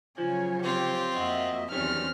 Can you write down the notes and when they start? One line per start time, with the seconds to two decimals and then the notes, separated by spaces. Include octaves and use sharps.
0.18 C#3 F3 F#3 C#5 G#5
0.63 C4 F4 G4
1.16 F2 A#3 F#4 D#5 E5
1.71 E2 D#3 F#3 G3 C4 C#4 F6